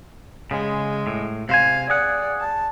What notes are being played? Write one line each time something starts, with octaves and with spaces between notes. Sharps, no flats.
C#3 G#3
A2
C3 C5 F5 G#5
G#4 D5 F#5
A5